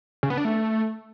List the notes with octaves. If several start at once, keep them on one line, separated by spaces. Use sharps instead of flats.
C#3
B3
D4
A3